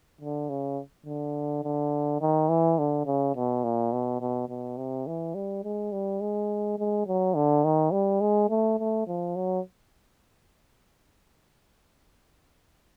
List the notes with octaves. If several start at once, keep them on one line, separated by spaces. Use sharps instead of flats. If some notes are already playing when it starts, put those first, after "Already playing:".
D3
C#3
D3
D3
D#3
E3
D3
C#3
B2
A#2
B2
B2
B2
C3
E3
G3
G#3
G3
G#3
G#3
F#3
D3
D#3
G3
G#3
A3
A3
F3
F#3